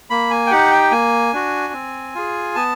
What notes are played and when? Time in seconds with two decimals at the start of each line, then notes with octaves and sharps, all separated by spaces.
0.10 A#3 B5
0.31 G#5
0.47 G5
0.51 D#4 G4 F#5
0.71 G5
0.91 A#3 G#5
1.33 D4 F#4
1.73 C4
2.15 F4 G#4
2.55 B3 A5